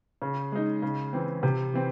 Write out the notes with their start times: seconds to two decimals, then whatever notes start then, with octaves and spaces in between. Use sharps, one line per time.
0.22 C#3
0.52 G#3 D#4
0.82 C#3
1.13 E3 C4
1.43 C3
1.74 E3 C4